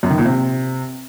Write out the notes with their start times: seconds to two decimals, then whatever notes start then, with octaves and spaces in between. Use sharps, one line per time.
0.03 F#2
0.11 D#3
0.18 A#2
0.25 C3